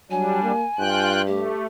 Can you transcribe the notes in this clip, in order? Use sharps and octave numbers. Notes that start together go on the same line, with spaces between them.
F#3 G3 D4 G#5
A#3
G2 F4 G5 F#6
A3 G4